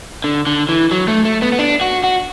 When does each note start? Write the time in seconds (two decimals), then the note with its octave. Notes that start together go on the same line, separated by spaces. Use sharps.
0.24 D3
0.47 D3
0.69 E3
0.91 F#3
1.08 A3
1.25 A3
1.42 B3
1.52 B3
1.59 D4
1.81 F#4
2.04 F#4